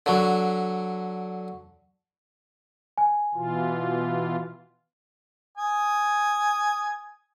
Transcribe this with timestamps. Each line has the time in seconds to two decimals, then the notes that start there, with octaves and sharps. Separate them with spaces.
0.06 D3 F#3
2.98 G#5
3.34 B2 E3 F4
5.58 G#5 D#6